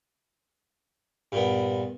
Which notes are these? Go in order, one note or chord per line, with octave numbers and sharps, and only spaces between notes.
G2 A#2 B3